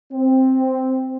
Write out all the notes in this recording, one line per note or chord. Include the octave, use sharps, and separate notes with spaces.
C4